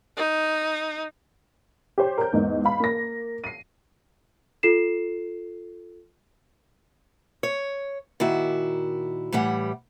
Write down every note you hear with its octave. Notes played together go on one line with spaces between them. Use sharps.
D#4
G4 C5 C#5
A#4 G6
E2 G#2 D#5
F5 B5
A#3 A#6
C7 D#7
F4 A4 C7 E7
C#5
A#2 D#3 E4 F#4
A2 E3 G3 F#5